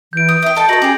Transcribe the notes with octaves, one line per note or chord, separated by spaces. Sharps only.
E3 G6 D7
D#6
E5 G5 D#6
A4 D#5 A5
F#4 A4 A#4 A#6 F#7
C#4 G4 G#4